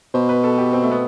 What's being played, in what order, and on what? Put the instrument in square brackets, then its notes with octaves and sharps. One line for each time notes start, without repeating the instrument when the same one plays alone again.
[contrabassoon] B2 [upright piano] C5
[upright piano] B4
A4
G4
C4
A3
B3